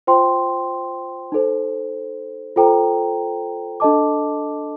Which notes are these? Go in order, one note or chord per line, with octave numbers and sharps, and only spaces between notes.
F4 C5 G5 C6
D#4 A4 C5
F4 A4 C5 G5 A#5
D4 A4 D#5 A5 D6